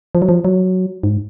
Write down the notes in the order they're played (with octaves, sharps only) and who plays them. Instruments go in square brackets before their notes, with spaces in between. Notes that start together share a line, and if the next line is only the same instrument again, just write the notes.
[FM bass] F3
F#3
F3
F#3
G#2